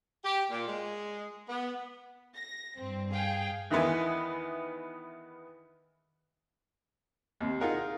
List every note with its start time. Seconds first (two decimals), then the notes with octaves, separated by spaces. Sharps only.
0.24 G4
0.50 A#2
0.68 G#3
1.48 B3
2.35 A#6
2.79 G2 C4
3.13 G#4 F5 G5
3.71 E2 D#3 E3 B3 G#5
7.40 D#2 C3
7.60 D#4 F4 G#4 A#4 F#5